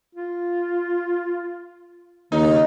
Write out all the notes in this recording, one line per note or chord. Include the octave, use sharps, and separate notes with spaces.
F4
D#2 C#3 D#4